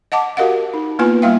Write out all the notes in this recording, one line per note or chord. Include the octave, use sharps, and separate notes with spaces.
D#5 F#5 A5 D6
F#4 G4 A#4 D#5 F5 F#5
D#4
A#3 B3 E4 F4 B4 G#5
G3 A#3 E4 E5 F5 G5